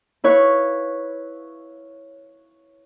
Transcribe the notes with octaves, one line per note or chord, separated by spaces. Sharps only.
E4 B4 C#5 F5